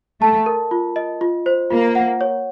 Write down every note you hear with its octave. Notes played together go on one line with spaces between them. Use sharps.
A3 A5
A#4
F4
D#5
F4
C5
A#3 F4
F#5
C#5